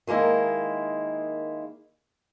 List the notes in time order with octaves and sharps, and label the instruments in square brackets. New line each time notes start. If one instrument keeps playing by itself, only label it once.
[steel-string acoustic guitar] D#3 G#3 A#3 E4